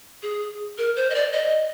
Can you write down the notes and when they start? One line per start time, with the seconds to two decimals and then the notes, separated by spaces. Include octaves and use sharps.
0.22 G#4
0.78 A#4
0.96 C5
1.10 D#5
1.15 D5
1.33 D#5